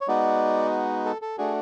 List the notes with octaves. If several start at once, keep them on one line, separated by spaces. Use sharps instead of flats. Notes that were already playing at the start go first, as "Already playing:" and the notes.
C#5
G#3 B3 D#4 F#4 D5
A4
A4
A3 D4 F#4 G#4